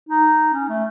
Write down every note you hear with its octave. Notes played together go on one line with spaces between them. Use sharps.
D#4
C#4
A3